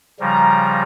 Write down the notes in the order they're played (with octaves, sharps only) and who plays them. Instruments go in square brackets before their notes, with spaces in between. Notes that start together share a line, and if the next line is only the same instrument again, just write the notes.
[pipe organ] C#3 F3 G3 [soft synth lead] A#5